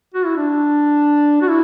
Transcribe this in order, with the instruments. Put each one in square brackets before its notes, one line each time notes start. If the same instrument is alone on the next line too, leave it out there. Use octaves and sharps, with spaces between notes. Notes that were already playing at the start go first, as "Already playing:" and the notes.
[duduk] F#4
E4
D4
F#4
E4